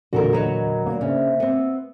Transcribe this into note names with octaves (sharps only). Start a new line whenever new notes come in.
E2 A#2 D3 F#4 A4 A#4
F#3 A#4 B4 C#5 D#5 A#5
A#3 D4 D5
C#3 C5 E5
B3 C4